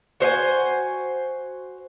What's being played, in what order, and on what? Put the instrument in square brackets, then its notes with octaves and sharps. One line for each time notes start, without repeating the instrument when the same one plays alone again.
[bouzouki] F#4 C5 C#5 G#5